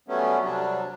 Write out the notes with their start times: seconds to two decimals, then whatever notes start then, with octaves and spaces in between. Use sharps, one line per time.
0.08 F#3 G3 A3 B3 C#4
0.43 C3 F#3 G3 D4